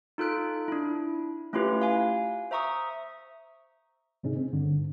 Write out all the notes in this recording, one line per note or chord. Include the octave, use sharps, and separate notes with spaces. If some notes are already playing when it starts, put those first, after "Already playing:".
D#4 F4 A4 F#6 D7
D4 E4
A3 C#4 E4 F4 G4 B4
F5 G#5
C5 E5 A#5 C#6 D#6
G#2 C3 C#4 D#4 G#4
C4
G2 D3